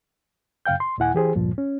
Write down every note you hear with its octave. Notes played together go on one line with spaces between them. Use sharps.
F#2 C#3 F5 G5 G6
C6
D#2 A#2 E4 F#5 G#5
E3 G4 G#4 C5
D2 G2 A#2 F3
C#4